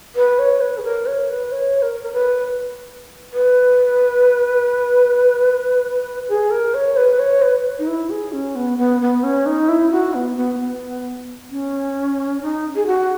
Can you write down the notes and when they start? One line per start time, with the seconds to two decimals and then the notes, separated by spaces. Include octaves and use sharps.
0.16 B4
0.39 C#5
0.61 B4
0.77 G#4
0.84 A#4
1.06 C#5
1.29 B4
1.52 C#5
1.82 A#4
2.03 A#4
2.13 B4
3.33 B4
6.29 G#4
6.51 A#4
6.74 C#5
6.97 B4
7.19 C#5
7.42 B4
7.79 D#4
7.87 E4
8.10 G#4
8.32 C#4
8.55 B3
8.78 B3
9.01 B3
9.23 C#4
9.46 D#4
9.69 E4
9.92 F#4
10.14 B3
10.37 B3
10.60 B3
11.50 C#4
12.41 D#4
12.75 G#4
12.87 F#4